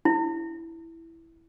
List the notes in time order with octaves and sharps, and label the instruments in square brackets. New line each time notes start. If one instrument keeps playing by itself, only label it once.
[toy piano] E4